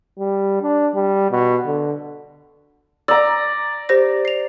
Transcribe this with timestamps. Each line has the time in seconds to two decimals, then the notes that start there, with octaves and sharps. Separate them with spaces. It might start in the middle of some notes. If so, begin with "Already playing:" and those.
0.19 G3
0.62 D4
0.95 G3
1.31 B2
1.66 D3
3.08 D5 A#5 E6
3.89 G4 C5 A#6
4.25 C7 F7